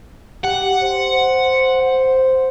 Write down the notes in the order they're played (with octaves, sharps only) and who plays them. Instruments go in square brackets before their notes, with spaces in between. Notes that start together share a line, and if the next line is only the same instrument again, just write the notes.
[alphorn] G4 [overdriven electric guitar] F#5
[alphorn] C5